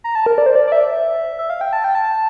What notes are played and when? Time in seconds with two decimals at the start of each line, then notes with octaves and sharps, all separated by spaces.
0.04 A#5
0.15 A5
0.26 A#4
0.38 D5
0.46 C5
0.55 D5
0.67 D5
0.72 E5
1.39 E5
1.50 F5
1.61 G5
1.73 A5
1.84 G5
1.95 A5